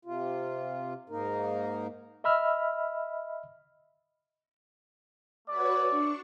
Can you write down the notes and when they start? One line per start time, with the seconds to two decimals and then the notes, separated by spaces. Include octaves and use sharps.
0.05 C3 F4
1.10 G#2 A#3 D#4 A#4
2.24 D#5 E5 B5 E6 F6
5.48 A3 F#4 B4 C#5 D5
5.90 D4 C#6